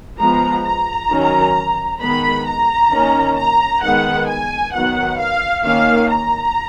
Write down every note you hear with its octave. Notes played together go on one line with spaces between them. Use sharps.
F3 G#3 B3 A#5
A#5
D#3 F#3 C#4
D#3 G#3 B3 B5
A#5
D#3 A#3 C#4
A#5
D#3 G#3 B3 F#5
G#5
D#3 F#3 B3 F#5
F5
D#3 A#3 C#4 F5
A#5